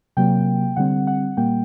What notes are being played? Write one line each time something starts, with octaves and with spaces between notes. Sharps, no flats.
C3 F#3 A#3 G5
D3 G3 C4 F#5
F#5
A#2 G3 A#3 G5